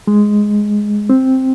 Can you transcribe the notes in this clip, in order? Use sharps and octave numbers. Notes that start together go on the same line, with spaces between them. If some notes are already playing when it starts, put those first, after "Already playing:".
G#3
C4